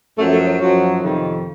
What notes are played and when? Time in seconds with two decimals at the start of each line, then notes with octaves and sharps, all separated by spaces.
0.18 F#2 F3 A3
0.31 A3
0.45 F#3
0.59 F#2 F3 F#3
1.01 F2 C3 D#3